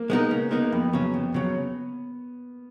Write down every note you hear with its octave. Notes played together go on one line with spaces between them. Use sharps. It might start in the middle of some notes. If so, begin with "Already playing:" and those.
Already playing: A#3
G#3 B3 D#4 A#4
C#3
G#3 B3 D#4 A#4
A#3
F2 B3
C#3 F#3
F2
C#3 F#3